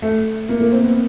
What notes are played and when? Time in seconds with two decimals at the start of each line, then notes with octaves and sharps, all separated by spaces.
0.02 A3
0.49 A#3
0.61 A#3
0.72 C4
0.84 B3